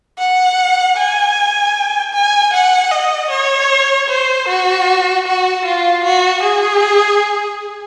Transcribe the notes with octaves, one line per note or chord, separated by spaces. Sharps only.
F#5
G#5
G#5
F#5
D#5
C#5
C5
F#4
F#4
F4
F#4
G#4